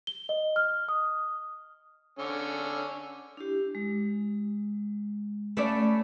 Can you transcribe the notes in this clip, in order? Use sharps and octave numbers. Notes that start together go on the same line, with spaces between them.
G7
D#5
F6
D#6
D3 C#4
D4 E4 G4
G#3
A3 C#4 D5 B5